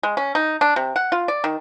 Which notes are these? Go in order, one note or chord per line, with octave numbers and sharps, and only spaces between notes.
G#3
C#4
D#4
D4
C3
F#5
F4
D5
D#3